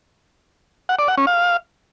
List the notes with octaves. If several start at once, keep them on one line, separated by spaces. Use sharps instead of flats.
F#5
D5
F#5
C#4
F5